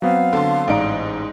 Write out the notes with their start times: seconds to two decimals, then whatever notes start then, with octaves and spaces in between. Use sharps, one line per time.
0.02 F#3 B3 C4 F5
0.33 D3 A5 C6
0.68 A1 G#2 D#4 D5 A#5 D7